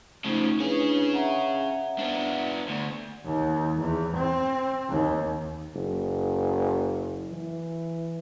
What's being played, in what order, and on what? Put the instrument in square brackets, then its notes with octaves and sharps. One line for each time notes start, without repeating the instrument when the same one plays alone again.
[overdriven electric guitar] C#3 F3 [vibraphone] A3 D#4
[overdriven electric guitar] C#4 G#4 [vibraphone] D4 E4 B4
[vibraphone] E5 F#5 A#5
[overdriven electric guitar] B3 D4
D2
[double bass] D#2
E2
C4
D#2
[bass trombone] F#1
E3